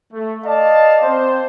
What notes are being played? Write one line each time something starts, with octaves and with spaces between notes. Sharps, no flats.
A3
D5 D#5 F5 A5
C4 C5